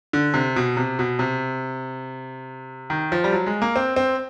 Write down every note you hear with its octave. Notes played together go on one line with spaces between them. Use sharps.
D3
C3
B2
C3
B2
C3
D#3
F3
G3
F#3
G#3
A#3
C4
C4